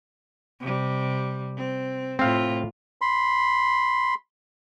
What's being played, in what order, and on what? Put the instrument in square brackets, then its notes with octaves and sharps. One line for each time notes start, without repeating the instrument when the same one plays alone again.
[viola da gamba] C3 G3
C4
[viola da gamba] A2 F4 [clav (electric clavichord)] C4 F5
[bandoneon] B5 C6